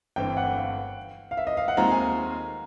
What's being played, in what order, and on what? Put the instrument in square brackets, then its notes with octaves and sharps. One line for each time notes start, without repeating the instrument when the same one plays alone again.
[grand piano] G1 G2 E3 A3 C4 [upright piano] G5
[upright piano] F#5
F5
F5
E5
D#5
F5
F#5
[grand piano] D#2 D#3 G#3 C4 F4 [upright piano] A#5
[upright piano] G#5